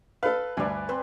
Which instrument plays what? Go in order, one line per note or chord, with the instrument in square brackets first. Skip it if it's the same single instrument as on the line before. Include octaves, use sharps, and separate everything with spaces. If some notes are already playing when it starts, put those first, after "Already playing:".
[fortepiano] A4 F5 [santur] B4
[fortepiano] D2 G2 [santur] D5 G#5
[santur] C4 B4 C5